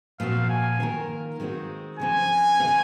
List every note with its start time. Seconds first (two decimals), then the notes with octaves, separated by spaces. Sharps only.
0.20 A#2 F3 C4 F#4 F5
0.49 G#5
0.80 D#3 A#3 F4 A#4
1.40 D#3 G#3 C4 F#4
1.99 C#3 F3 C4 G#5
2.60 D#3 G#3 C4 F4